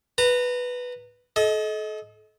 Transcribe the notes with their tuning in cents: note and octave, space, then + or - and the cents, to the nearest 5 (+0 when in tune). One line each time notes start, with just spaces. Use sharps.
B4 +0 A#5 -30
A4 -35 D#5 +20